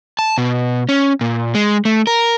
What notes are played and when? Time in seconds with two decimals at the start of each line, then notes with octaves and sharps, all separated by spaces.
0.19 A5
0.38 B2
0.89 C#4
1.21 A#2
1.55 G#3
1.85 A3
2.07 A#4